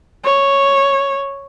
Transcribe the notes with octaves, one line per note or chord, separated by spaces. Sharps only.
C#5